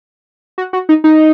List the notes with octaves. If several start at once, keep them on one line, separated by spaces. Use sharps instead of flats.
F#4
F#4
D#4
D#4